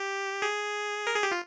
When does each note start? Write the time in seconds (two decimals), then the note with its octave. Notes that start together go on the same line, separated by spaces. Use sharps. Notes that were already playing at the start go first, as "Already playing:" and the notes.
Already playing: G4
0.42 G#4
1.07 A#4
1.16 G#4
1.23 G4
1.32 F4